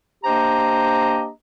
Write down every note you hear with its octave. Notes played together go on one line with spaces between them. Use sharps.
A#3 D4 G4 C5 D#5 A#5